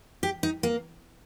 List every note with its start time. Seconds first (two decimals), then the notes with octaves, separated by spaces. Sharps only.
0.23 G4
0.43 D#4
0.63 A#3